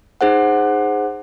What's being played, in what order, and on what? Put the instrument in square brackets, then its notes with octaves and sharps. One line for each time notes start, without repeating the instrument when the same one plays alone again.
[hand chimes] D#4 G#4 C5 F#5